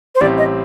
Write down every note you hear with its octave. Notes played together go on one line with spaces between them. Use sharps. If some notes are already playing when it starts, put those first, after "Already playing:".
C5
A1 A2 G3 C4 G4 D5
D#5